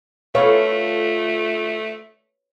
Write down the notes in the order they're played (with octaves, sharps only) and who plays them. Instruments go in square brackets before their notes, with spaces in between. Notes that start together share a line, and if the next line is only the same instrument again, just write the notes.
[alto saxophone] A3 [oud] F4 A4 E5 [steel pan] B4 C#5 F5